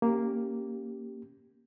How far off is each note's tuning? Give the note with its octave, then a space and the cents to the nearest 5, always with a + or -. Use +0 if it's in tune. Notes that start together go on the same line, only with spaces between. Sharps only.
A#3 +0 C#4 +0 G4 -5